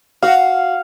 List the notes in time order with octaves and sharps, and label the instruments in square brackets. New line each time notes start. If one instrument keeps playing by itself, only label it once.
[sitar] F#4 [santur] F5